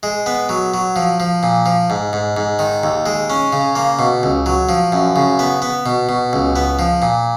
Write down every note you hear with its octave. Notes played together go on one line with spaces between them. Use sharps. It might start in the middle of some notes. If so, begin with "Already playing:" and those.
G#3
B3
F#3
F#3
F3
F3
A#2
F3
G#2
G#2
G#2
D#3
D#2
G#3
C#4
C#3
A#3
B2
C#2
F#3
F3
F#2
C#3
B3
B3
B2
B2
C#2
B3
F3
A#2